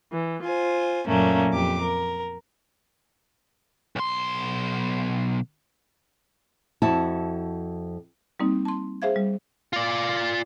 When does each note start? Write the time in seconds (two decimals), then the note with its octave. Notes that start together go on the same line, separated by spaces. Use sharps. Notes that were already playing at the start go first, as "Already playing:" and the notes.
0.13 E3
0.43 F4 C5 G#5
1.06 F#2 A#2 F#3 A3 A#3 C#4
1.51 F2 G4 D6
1.81 A#4
3.96 B1 C6
6.82 F2 E4 F#4 A5
8.40 G3 A#3 C4 D#4
8.65 A5 C6
9.02 G#4 C5 E5 F5 G#6
9.16 G3
9.73 F4 D5